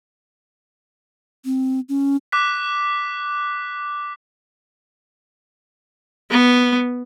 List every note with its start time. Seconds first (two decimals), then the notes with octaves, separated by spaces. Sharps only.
1.45 C4
1.89 C#4
2.32 D6 F#6 B6
6.31 B3